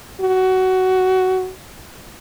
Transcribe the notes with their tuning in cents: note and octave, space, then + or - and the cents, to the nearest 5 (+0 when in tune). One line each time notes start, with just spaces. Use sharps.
F#4 +15